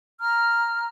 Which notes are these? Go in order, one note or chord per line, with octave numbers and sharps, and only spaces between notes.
A#5 F6